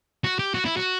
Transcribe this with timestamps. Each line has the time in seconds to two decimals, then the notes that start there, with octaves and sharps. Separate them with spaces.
0.24 F#4
0.39 G4
0.54 F#4
0.65 E4
0.77 F#4